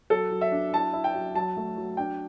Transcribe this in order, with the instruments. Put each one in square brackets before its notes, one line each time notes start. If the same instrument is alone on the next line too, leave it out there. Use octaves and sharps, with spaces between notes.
[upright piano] F#3 A4
F#3
E5
D4
E4 A5
E4
G5
F#3
F#3 A5
A3
F#3
D4 G5